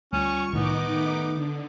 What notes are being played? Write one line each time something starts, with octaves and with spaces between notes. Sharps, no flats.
D2 G3 C#4 F4 C#6
C2 A2 D#3 B3 D#4 D6
D#3 A3
D3